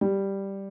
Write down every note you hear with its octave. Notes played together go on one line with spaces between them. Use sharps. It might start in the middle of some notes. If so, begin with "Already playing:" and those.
G3